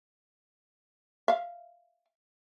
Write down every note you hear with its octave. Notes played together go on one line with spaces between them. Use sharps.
E5 F5